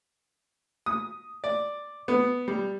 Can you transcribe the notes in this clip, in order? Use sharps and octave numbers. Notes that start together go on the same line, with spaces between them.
D#6
D5
B3
G3